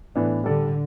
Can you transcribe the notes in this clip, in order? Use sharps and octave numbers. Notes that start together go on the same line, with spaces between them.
A2 E3 B3 D4
D3 G3 D4 A4 D5